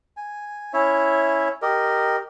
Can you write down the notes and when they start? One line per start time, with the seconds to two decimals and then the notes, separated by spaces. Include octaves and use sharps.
0.17 G#5
0.73 C#4 E4 C#5 E5
1.62 G4 A#4 D#5